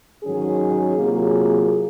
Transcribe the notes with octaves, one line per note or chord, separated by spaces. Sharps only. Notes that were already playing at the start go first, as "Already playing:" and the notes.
G#2 D#3 F#3 C#4 G#4
C3 F#3 A#3 F4 G#4